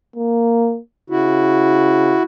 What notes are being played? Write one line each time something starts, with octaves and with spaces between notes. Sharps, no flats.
A#3
C#3 E4 F#4